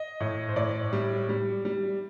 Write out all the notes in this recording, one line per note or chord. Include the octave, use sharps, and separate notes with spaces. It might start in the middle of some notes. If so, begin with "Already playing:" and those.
Already playing: D#5
A2
C5
A2 D5
G3
G3
G3